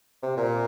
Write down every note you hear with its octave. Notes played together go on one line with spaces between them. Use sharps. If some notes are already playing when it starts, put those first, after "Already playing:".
C3
A#2